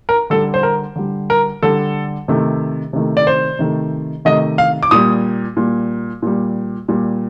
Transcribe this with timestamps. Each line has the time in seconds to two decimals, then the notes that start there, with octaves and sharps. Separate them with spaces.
0.09 A#4
0.30 D3 G3 A4
0.54 C5
0.63 A#4
0.96 D3 G3
1.30 A#4
1.63 D3 G3 A4
2.28 C3 D#3 A3
2.93 C3 D#3 A3
3.17 D5
3.27 C5
3.59 C3 D#3 A3
4.25 C3 D#3 A3 D#5
4.58 F5
4.83 D6
4.91 A#2 G3 D#6
5.57 A#2 G3
6.22 A#2 G3
6.88 A#2 G3